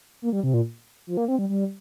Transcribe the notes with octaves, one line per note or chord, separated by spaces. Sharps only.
A#3
G3
C3
A#2
F3
A#3
C4
G3
G3